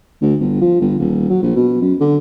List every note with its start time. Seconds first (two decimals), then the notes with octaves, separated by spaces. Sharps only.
0.21 D2
0.40 G1
0.61 F3
0.80 G1
0.99 D#1
1.30 F#3
1.43 A#1
1.56 B2
1.81 F#2
2.01 D3